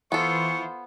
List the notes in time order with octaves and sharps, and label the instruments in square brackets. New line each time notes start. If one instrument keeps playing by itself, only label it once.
[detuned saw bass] E3 [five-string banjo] B3 A4 [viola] F4 C5 [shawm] C#6